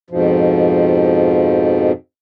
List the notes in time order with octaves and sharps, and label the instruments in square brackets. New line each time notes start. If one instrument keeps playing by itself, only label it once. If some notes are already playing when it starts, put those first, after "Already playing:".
[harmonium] F2 G#2 B2 F3